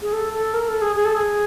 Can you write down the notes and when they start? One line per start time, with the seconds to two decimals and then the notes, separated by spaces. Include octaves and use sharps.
0.02 G#4
0.13 A4
0.33 A4
0.54 A#4
0.68 A4
0.82 G#4
0.96 G#4
1.05 A4
1.15 G#4